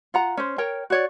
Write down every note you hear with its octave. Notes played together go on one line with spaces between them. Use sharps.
F4 F#5 A#5
C#4 C5
A#4 C#5 G5
F#4 C#5 D5